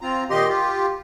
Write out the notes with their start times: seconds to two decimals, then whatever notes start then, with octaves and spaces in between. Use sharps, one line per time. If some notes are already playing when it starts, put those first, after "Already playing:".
0.01 C4 F4 A#5
0.30 A#2 D#3 G4 D#5 C6
0.48 F4 G4